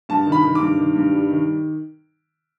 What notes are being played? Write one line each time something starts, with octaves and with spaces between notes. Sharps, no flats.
G2 A5
D#3
B5
D#3
G2 D6
D#3
G2
G3
D#3